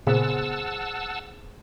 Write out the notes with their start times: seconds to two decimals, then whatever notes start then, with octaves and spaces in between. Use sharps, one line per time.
0.07 A#2 C#3 B3 G#4 C5 F#5 A5 E6